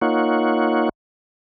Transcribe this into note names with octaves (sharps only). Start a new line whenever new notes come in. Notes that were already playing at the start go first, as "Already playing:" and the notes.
A#3 D#4 F4 C#5 F#5